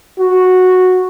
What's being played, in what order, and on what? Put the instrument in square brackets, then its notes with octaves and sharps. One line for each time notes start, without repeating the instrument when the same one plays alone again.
[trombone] F#4